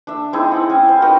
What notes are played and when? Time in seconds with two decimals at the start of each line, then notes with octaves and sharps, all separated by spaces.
0.07 D4 E5
0.33 G#3 C4 D#4 E4
0.52 F#5 G5
0.70 C#4
0.89 C5
1.02 D#4 F#4 A#4 B4